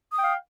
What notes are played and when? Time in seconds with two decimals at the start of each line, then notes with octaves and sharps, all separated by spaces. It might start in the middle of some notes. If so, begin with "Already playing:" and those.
0.13 D#6
0.18 G5
0.23 F5